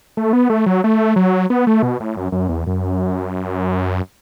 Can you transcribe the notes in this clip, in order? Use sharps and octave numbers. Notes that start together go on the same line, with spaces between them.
A3
B3
A3
F#3
A3
F#3
B3
A3
B2
A2
F#2
F#2
E2
F#2